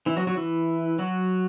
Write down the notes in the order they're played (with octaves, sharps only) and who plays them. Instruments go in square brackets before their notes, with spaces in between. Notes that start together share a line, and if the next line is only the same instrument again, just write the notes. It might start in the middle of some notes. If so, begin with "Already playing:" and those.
[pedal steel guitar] E3 E4
F#3 F#4
F#3 F#4
E3 E4
F#3 F#4